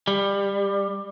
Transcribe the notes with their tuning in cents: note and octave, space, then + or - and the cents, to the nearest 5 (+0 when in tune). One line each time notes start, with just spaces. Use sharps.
G3 +20